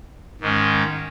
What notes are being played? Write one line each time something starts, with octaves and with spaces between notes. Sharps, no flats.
G#2 D#3 G#3 C#4